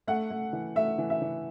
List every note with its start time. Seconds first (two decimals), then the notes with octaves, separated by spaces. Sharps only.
0.07 A3 F#5
0.31 A3
0.53 E3
0.76 A3 E5
0.98 E3
1.10 E5
1.22 E3